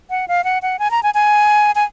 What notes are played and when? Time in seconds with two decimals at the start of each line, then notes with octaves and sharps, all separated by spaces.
0.10 F#5
0.28 F5
0.44 F#5
0.62 F#5
0.79 G#5
0.91 A#5
1.03 G#5
1.14 G#5
1.75 G#5